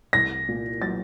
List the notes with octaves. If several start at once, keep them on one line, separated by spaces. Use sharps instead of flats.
C2 A#6
A#2
F#3 A6